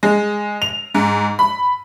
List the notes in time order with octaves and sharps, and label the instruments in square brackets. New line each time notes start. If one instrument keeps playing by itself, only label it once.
[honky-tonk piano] G#3
F7
G#2
B5